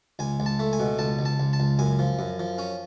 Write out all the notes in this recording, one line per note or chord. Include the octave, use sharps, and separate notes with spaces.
C#2 G#5
C#2
A5
A3
G#5
B2
C#2 A5
C#2
A5
C#2
A5
C#2
F#2 G#5
F3
F#2
F3
C#4